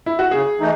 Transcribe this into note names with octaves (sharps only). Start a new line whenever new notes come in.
E4
F#4
C#3 G#4
E3 A3 D#4